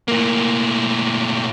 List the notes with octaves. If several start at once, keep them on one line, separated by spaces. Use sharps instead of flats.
A2 A#3